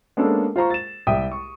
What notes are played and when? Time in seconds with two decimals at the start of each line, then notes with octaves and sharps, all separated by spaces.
0.17 G#3 A#3 B3 C#4 D4 A4
0.56 F4 C5 A#5 C#6
0.70 A6 E7
1.07 C2 G4 E5 G5 D#6 D#7
1.32 C#6